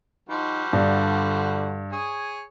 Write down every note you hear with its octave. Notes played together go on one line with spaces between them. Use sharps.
F3 G3 D#4 F#4
G2 D3
G#4 C#5 D#6